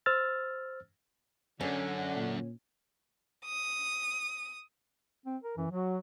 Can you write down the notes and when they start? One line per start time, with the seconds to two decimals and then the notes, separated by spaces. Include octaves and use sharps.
0.06 C5 E6 F6 A6
1.61 F#2 D3 C#4
2.16 A#2
3.46 D#6
5.26 C4
5.43 A#4
5.57 F#2 E3
5.71 F#3 F#4